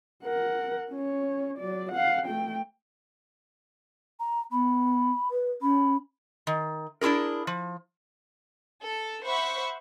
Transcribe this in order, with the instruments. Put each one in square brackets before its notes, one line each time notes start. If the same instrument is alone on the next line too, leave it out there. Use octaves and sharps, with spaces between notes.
[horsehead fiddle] A#4 F#5
C#4 C#5
F#3 D5
F5 F#5
A3 G5
[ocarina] A#5
[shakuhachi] B3 [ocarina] B5
[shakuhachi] B4
[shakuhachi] C#4 [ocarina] B5
[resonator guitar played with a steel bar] D#3
D4 E4 F4 G#4 A#4
F3
[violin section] A4
C5 E5 F#5 B5 C#6